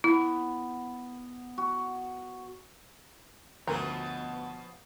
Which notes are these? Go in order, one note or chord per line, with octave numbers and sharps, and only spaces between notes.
B3 E4
F#4
D2 B2 F3 B3 C#4 A4 A#4 A#5